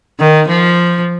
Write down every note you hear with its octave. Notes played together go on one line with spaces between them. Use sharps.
D#3
F3